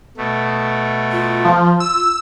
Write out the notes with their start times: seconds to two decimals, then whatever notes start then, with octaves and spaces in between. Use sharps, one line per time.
0.17 B2 A3
1.12 F4
1.45 F3
1.80 E6